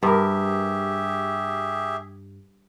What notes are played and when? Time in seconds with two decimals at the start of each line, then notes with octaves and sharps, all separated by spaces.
0.03 G2 G4 G#4 A#4 E5